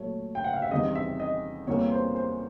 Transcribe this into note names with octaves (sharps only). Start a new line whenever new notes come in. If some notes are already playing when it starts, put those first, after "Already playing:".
Already playing: A#2 F#3 A3 C#5
G5
F#5
F5
E5
E2 C3 D#3 G3 D#5
E5
D#5
E2 C3 E3 G3 A#3 C#5
C5
C5